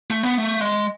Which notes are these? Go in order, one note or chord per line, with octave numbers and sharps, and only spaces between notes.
A3
B3
A3
G#3